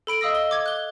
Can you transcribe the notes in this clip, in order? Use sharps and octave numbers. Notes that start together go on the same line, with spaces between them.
A4 B5 D7 F#7
D#5 F5 D#6 E6 A#6
G7
D6 G#6
F#6 G7